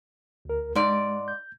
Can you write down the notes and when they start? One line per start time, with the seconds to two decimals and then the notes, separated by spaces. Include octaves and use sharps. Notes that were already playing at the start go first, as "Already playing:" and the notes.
0.45 D2 A#4
0.75 G#2 G#3 D5
1.28 G6